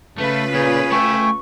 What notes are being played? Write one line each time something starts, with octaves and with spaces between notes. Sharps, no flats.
C#3 A3 F4 B4
A#2 G#4 C#5
A3 E5 G5 G#5 C#6